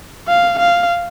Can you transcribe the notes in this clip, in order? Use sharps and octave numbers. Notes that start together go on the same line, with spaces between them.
F5
F5